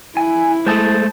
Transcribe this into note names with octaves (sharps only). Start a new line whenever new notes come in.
E4 G#5
G#3 A3 C5 A5 D#6